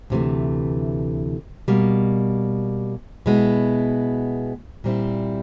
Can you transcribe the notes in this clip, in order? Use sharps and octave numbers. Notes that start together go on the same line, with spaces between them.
D2 C3 E3 A3
B2 G3 A#3
B2 G#3 B3 E4
A#2 G3 C4 E4